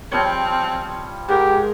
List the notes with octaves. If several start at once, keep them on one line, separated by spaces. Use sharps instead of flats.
F3 G3 C4 C#5
G#2 G4 A#4